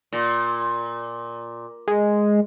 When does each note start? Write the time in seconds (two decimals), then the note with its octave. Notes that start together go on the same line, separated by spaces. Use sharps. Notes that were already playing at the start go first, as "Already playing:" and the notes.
0.13 A#2
1.88 G#3